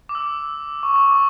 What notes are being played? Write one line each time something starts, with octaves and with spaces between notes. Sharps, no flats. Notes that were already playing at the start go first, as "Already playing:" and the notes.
D6
E6
C#6
D6
C#6